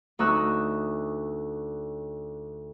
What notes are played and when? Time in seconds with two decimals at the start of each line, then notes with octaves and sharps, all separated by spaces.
0.19 D2 D#4 C#6 E6 F#6